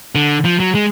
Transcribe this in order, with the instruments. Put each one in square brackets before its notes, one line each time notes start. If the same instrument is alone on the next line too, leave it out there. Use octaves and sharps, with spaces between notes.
[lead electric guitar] D3
F3
F#3
G#3